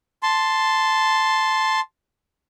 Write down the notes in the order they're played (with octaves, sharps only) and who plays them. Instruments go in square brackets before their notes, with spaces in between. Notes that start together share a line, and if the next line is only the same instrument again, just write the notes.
[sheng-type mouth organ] A5 C6